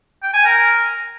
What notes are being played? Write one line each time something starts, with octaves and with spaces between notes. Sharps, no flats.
G5
G#5
A#4